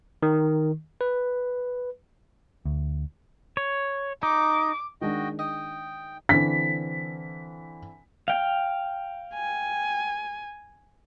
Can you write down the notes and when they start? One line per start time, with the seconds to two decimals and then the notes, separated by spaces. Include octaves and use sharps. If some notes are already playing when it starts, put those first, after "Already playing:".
0.23 D#3
1.01 B4
2.65 D2
3.57 C#5
4.23 D#4 D6
5.01 D#3 G#3 D4 F#4 D#5 G5
5.39 D#5 G5
6.29 D3 E3 C4 B6
8.28 F5 G5
9.34 G#5